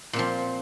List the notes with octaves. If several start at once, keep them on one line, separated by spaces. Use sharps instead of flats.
A#2 F3 C4